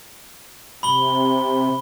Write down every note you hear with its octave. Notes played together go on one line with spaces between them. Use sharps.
C3 B5 G7